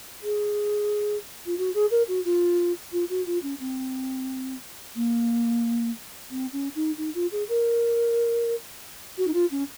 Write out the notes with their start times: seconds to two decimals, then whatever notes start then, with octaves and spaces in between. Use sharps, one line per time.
0.22 G#4
1.46 F4
1.57 F#4
1.74 G#4
1.90 A#4
2.07 F#4
2.24 F4
2.92 F4
3.09 F#4
3.26 F4
3.42 C#4
3.59 C4
4.95 A#3
6.30 C4
6.52 C#4
6.75 D#4
6.97 D#4
7.14 F4
7.31 G#4
7.48 A#4
9.17 F#4
9.27 D#4
9.33 F4
9.51 C#4